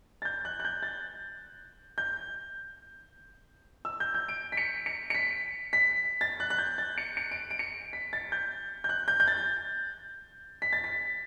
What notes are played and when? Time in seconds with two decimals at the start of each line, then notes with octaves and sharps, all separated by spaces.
0.22 A6
0.25 G6
0.45 F#6
0.60 F#6
0.65 G6
0.83 A6
1.98 G6
3.85 E6
4.00 G6
4.14 G6
4.28 D7
4.52 B6
4.57 C#7
4.86 C#7
5.10 C#7
5.14 B6
5.73 B6
6.21 A6
6.40 F#6
6.50 F#6
6.58 G6
6.78 A6
6.98 C#7
7.17 C#7
7.31 D7
7.51 D7
7.59 C#7
7.93 B6
8.13 A6
8.32 G6
8.84 G6
8.89 F#6
9.08 G6
9.20 G6
9.28 A6
10.62 B6
10.73 A6
10.84 B6